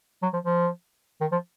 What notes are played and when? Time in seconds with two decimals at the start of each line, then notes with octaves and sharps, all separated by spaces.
0.22 F#3
0.33 F3
0.45 F3
1.21 D#3
1.32 F3